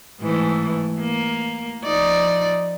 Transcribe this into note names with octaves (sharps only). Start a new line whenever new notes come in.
G#2 E3 A3
A#3
F3 D#4 D5